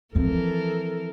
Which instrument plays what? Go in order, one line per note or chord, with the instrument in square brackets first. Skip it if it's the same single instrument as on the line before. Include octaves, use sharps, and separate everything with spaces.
[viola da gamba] E3 A4 A#4 [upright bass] F3 C4